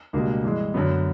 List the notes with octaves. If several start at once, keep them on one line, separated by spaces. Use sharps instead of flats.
C#2 B2 G3 A#3 D4
G2 E3 G#3
F#2 D3 F#3 B3